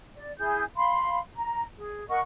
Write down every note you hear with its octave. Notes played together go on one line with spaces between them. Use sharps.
D5
E4 G#4 G6
F5 B5 C6
A#5
G#4
A#4 D#5 F#5 C#6